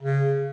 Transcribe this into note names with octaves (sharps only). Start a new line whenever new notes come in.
C#3